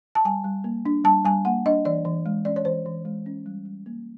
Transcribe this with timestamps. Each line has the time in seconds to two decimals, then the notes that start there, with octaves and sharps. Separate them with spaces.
0.15 A5
0.25 G3 G#5
0.44 G3
0.64 A#3
0.85 D4
1.04 G3 A5
1.25 G3 G#5
1.45 A#3 F#5
1.66 D4 D#5
1.85 E3 D5
2.05 E3
2.26 G#3
2.45 C#4 D5
2.56 C#5
2.65 E3 C5
2.86 E3
3.05 G#3
3.26 C#4
3.46 G3
3.65 G3
3.86 A#3